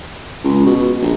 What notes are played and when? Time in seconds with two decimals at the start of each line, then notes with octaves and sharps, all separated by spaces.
0.44 C#2
0.66 B2
1.02 A#1